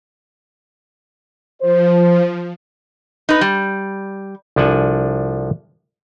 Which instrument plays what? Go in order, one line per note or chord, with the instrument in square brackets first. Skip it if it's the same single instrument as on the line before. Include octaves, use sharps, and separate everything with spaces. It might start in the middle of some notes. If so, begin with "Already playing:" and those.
[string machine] F3 [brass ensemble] C5
[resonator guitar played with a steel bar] D#4 B4
G3
[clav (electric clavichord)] C2 F3 D4 A4 F#5 G#5